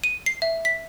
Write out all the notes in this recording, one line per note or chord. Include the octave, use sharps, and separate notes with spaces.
D#7
C7
E5
B6